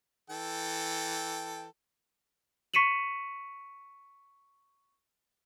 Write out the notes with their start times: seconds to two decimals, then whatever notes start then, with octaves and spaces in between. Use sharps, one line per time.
0.30 E3 A4 G5
2.74 C#6 B6 C#7 D#7 E7 F#7